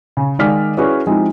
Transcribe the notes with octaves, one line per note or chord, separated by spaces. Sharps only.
C#3
D#3 G#3 D5 F5 F6 B6
C#4 E4 F#4 G#4 B4 D5
F3 G#3 C4 D#4 E4 G4